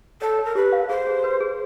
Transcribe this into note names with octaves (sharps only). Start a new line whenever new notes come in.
A4 C#5
C#5
A#4
G4 B4
F5
G#4 C5
G#4
B4
G#4